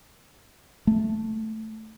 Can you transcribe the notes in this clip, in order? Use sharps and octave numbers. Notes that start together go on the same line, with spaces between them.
A3